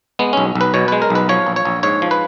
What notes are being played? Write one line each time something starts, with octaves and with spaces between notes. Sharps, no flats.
G#3 B3
B1 C#4
B1
B4
B2 C#5
G#3 B4
A#4
B1 B4
F3 C#5
A#1
C#5
A#1
G#2 C#5
F3
B4